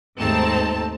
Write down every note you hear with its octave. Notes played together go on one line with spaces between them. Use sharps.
D#2 G#2 A3 C4 D#4 A5